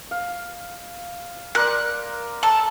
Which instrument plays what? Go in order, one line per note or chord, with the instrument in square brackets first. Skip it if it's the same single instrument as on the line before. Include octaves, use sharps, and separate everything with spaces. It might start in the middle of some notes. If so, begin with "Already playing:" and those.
[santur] F5
[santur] A#4 C5 D5 [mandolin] F#6
[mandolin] A4